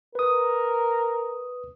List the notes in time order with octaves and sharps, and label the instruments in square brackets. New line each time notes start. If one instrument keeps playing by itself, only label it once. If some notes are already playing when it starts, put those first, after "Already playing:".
[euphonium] A#4 [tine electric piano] B4 D#6